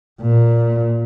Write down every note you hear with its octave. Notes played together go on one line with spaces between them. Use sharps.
A#2